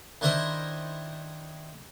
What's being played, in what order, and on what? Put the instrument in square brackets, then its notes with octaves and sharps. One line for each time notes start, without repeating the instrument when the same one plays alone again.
[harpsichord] D#3 D4 E4 A#4 C5 D#5